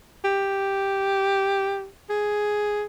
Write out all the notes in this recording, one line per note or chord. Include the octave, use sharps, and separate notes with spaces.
G4
G#4